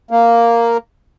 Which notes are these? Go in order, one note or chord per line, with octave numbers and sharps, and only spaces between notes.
A#3